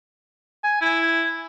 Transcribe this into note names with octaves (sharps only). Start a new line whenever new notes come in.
G#5
E4